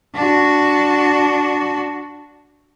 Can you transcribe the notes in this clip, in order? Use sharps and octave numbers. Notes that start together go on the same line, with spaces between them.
D4 F#4